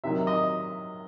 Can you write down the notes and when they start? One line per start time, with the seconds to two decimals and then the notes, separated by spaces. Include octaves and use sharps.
0.04 C3 D#3 F#3 E5
0.27 D#5